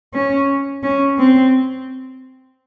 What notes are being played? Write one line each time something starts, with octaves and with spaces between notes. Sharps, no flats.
C#4
C#4
C4